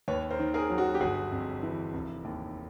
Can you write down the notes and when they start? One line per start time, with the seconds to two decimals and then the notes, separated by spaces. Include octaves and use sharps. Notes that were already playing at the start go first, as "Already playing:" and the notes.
0.08 D#2 B4 C#5
0.31 A#4 C5
0.39 D#3
0.54 G#4 A#4
0.70 F#3
0.78 F#4
0.94 G4
1.00 G1 F#4 G#4
1.32 F2
1.62 E3
1.94 F1
2.25 D#2